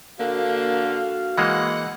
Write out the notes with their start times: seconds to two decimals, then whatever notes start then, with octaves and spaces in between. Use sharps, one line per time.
0.20 D3 A#3 F#4 F5
1.38 E3 G#3 A#3 D#5 F#5